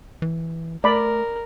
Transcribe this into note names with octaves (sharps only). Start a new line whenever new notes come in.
E3
A3 A#4 D5 B5